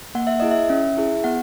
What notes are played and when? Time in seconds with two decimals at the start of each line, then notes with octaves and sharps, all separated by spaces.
0.15 A#3 F#5
0.27 E5
0.40 E4 G#4 D#5
0.51 E5
0.70 C#4
0.97 E4 G#4
1.24 B3 F#5